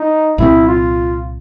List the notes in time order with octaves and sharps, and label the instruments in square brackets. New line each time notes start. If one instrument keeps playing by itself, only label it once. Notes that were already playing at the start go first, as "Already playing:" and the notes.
Already playing: [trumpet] D#4
[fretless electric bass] C2 A#2 G3 C4 [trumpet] E4
[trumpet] F4